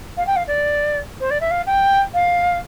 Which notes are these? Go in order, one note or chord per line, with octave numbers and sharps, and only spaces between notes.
F5
G5
F5
D5
C5
D5
E5
F5
G5
F5